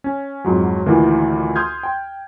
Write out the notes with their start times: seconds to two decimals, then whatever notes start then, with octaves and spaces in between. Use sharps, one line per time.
0.04 C#4
0.45 F2 G#2 F#3
0.86 D2 A#2 D#3 E3
1.56 C6 D#6 F6 G6 G#6
1.83 G5